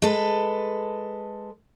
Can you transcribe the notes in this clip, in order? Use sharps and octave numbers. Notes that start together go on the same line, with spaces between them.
G#3 A4 B4